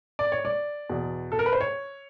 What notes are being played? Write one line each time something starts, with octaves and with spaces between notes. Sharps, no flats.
D5
C#5
D5
E2 B2
A4
A#4
B4
C5
C#5